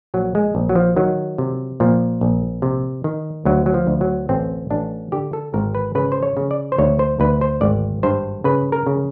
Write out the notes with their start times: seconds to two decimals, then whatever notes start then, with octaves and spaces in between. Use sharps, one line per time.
0.14 A#1 F#3
0.35 G#3
0.55 A#1
0.69 F#3
0.75 F3
0.96 D#3 F#3
1.38 C3
1.80 A#2 F3
2.21 A#1
2.62 C3
3.04 D#3
3.45 D2 F#3
3.66 F#3
3.74 F3
3.87 D2
4.01 F#3
4.29 A1 C4
4.71 A1 D4
5.12 D3 G4
5.33 A4
5.54 G#1 A#4
5.75 B4
5.95 C#3 B4
6.12 C5
6.23 C#5
6.37 C#3
6.51 D5
6.72 C5
6.78 D2 C#5
6.99 C5
7.20 D2 B4
7.41 C5
7.61 G#1 D5
8.03 G2 C5
8.44 C#3 B4
8.72 A#4
8.87 C#3